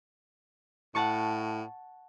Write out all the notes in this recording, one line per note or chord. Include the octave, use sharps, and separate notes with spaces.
A2 F#5 A5 C#6